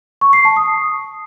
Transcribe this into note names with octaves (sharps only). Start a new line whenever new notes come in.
C#6
C7
A5
D#6